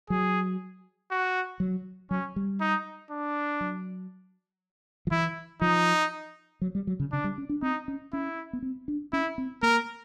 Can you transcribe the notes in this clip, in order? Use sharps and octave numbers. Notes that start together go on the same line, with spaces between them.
F#3 G#4
F#4
F#3
F#3 C#4
G3
D#4
D4
F#3
F3
E3 E4
F3 D#4
F#3
G3
F#3
C#3
C#3 D4
G3
C#4
D4
C4 D#4
C#4
C#4 E4
B3
C4
D4
C#4 E4
C4
A#3 A#4